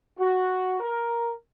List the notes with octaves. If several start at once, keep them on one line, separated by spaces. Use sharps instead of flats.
F#4
A#4